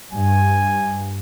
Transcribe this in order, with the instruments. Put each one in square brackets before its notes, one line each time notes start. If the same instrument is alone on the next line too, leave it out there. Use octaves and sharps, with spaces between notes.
[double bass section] G2 [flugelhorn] G#5